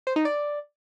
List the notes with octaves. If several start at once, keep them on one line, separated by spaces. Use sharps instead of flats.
C5
D#4
D5